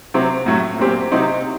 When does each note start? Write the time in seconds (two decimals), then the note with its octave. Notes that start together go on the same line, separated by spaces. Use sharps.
0.14 C3 F#3 C4
0.46 A2 F#3 A3
0.78 A#2 F#3 C4 G4
1.12 C3 F#3 C4 D#4